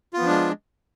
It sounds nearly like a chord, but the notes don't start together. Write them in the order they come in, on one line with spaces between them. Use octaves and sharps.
F4 B3 F3 D4 G#3